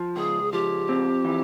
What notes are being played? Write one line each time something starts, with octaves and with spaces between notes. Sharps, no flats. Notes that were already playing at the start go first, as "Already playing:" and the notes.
Already playing: F3
C#2 G#4
F3 G4
C4
E3